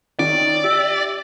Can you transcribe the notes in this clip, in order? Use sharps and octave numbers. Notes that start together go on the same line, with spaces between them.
D#3 C#4 D#4 D5
G4 E5